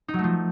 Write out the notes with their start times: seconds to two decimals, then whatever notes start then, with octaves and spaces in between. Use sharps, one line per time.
0.08 D#4
0.14 F#3
0.19 A3
0.24 F3